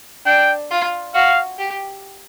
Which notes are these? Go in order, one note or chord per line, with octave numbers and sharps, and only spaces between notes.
D4 G5
F4
F#4 F5
G4